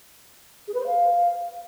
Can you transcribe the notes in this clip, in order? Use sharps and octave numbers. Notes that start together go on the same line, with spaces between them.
G#4
B4
C5
F5